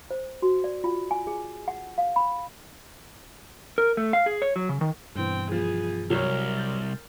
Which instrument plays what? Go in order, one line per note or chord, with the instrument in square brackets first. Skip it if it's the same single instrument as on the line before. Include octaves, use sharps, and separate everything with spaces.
[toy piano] C5
F#4
D5
F4
G#5
G#4
F#5
F5
B5
[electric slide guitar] A#4
A3
F5
G#4
C#5
F#3
C#3
D#3
[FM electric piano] G2 B2 E3 [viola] C4 G5
[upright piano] F3 [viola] B3 G#4
[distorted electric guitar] C2 [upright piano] F#3 C#5 [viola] A#4
[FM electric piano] C6 G6 A6